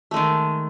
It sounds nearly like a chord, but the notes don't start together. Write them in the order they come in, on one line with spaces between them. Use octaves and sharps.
A3 G#3 D#3